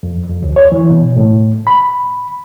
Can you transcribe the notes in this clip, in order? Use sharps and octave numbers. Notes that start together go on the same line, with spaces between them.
F2
F2
D2
C#5
E3
B2
A2
B5